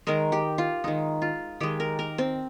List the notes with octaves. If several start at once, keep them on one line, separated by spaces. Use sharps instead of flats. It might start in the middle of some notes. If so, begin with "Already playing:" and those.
D#3 G#3 A#4
G4
F4
D#3 G#3 D#4
F4
D#3 G#3 G4
A#4
A#4
C4